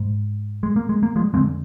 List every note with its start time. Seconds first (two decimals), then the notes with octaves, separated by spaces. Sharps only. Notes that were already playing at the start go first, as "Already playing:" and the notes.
Already playing: G#2
0.63 G#3
0.76 A#3
0.89 G#3
1.03 A#3
1.16 F3 G#3
1.34 F2 D3 G#3 C4